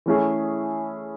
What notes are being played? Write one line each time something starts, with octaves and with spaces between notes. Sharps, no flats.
E3 A3 C#4 E4 G#4